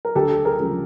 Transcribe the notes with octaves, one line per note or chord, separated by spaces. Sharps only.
A#4
D2 G4 A4
G#4 A#4
C#3 F3 G#3